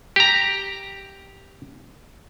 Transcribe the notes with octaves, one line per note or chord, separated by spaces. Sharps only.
G4 A#5